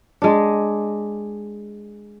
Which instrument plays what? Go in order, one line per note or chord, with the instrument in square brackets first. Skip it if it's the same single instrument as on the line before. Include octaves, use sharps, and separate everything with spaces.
[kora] G#3 D4